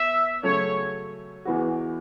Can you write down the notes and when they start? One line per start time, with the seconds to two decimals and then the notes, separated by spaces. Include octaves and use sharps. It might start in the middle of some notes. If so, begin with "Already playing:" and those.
Already playing: B3 E5
0.43 C#3 F#3 A3 C#4 A4 C#5
1.45 E2 E3 B3 F#4